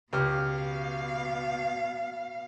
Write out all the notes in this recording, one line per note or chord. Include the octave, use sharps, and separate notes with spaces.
C#2 B2 G4 F5 F6